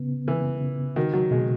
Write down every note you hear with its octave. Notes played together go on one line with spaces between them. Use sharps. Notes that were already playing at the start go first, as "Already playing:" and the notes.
Already playing: C#3 B3
C#3 E3
C#3
D#3 F#4
F#3
B2 G#3